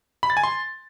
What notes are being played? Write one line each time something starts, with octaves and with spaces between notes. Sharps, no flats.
B5
A6
G#5
C6